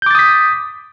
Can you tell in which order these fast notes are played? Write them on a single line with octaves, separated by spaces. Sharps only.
G6 D6 A6 D#6 B6